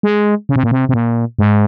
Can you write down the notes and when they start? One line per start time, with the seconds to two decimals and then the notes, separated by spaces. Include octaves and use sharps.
0.03 G#3
0.49 C#3
0.56 C3
0.63 A#2
0.71 C3
0.89 C3
0.94 A#2
1.39 G#2